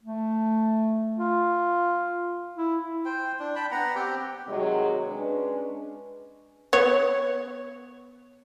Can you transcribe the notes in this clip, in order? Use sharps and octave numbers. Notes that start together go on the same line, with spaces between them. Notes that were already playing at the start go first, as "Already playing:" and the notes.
A3
F4
E4
C5 G5
D4
G5 A5 B5
B3 F#5 A#5
C4 G4 G5
C3 D#3 F#3 G#3
G#3 C#4 D4 B4
B3 C#5